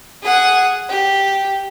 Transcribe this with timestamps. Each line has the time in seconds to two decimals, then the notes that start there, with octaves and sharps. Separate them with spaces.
0.23 G#4 F#5
0.89 G4